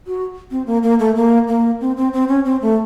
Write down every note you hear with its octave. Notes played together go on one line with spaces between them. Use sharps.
F#4
C4
A#3
A#3
A3
A#3
A#3
C4
C4
C4
C#4
C4
A3